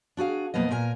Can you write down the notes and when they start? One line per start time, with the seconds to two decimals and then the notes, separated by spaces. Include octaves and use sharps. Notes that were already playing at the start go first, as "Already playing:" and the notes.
0.17 D4 F#4 G#4 F5
0.54 F2 B2 A#3 B3 D#5
0.71 A#2 A#4 G#5